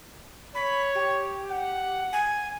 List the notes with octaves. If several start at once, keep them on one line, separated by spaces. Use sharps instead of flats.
C#5 B5
G4
F#5
G#5